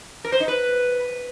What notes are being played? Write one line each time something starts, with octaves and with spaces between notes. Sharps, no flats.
A#4
C5
D#4
B4